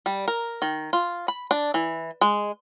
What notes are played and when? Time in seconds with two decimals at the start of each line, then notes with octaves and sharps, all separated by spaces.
0.06 G3
0.28 A#4
0.62 D#3
0.93 F4
1.28 B5
1.51 D4
1.74 E3
2.21 G#3